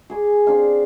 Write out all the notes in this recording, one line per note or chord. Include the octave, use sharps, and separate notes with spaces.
G#4 G#5 D6
C4 D4 F5